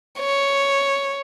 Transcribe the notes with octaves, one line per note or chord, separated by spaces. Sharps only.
C#5